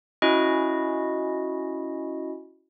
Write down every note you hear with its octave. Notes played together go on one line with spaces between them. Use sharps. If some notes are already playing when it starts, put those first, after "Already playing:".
C#4 E4 F#4 D#5